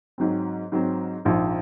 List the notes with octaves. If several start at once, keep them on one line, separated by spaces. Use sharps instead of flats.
G#2 F#3 C4
G#2 F#3 C4
A#1 G#2 F3